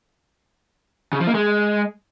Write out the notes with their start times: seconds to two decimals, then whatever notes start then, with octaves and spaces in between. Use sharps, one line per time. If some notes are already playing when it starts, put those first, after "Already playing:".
1.13 C#3
1.20 F3
1.27 A#3
1.35 G#3